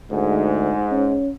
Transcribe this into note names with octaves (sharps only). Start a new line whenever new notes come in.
D2 G#2
C#4